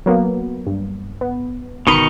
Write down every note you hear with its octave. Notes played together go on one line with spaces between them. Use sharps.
F#3 A#3 B3
G2
B3
G1 B2 D#3 D#4 B5 C#7